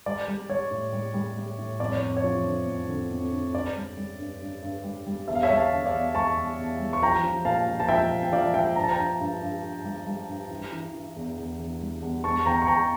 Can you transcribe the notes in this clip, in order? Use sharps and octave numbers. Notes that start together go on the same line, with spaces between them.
G3 D5
G3
G3 C#5
A2
G3
G3
G3
A2
F2 D5
C#5
F2
C#5
F3
D3
F2
D3
F2
D3
G2 D5
G3
G3
G2
G2
G2
G3
G3
E2 E5
F5
C#5 E5
G3
F5 A5
D3
D5 F5
E2
G3 A5 C#6
E2
E2
G3
C#6
F3 G5 A#5
F3
A#2 F5 A5
F3
A5
F3 E5 G5
A#2
G5
F3 D5 F5
F3 E5 G5
G2 A#5
A5
G5 A#5
G2
G2
G2
G2
G3
G3
G2
E3
E3
E3
E2
E2
E2
G3
E2
E2 A5 C#6
E2 G5 A#5
C#6
E2 G5 A#5